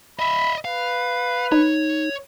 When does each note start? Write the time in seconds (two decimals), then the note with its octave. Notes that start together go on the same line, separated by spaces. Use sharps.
0.19 D#5 E5 B5
0.65 B4 F5
1.52 D#4 C#5